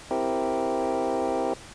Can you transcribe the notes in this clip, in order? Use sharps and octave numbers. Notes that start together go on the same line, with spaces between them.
C4 E4 G4 A#4